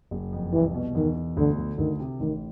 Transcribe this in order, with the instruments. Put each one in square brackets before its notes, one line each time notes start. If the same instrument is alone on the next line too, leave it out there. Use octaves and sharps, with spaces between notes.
[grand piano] F#1
F2
[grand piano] C2 [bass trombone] E3
[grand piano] B2
[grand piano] E2 [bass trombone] D#3
[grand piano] B2
[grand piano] D2 [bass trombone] D3
[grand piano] D3
[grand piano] D2 [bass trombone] D#3
[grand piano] C3
[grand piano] A1 [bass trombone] D#3